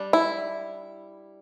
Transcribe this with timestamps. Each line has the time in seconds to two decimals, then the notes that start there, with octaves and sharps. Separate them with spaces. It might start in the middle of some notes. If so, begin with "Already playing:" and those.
Already playing: G3 D4
0.13 E4